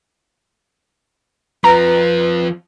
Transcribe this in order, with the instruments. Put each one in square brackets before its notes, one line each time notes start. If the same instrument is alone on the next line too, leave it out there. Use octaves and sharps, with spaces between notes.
[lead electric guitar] F2 F3 [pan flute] B4 [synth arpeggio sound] A#5